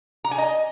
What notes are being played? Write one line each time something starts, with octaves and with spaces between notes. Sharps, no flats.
A#5
G#5
D#5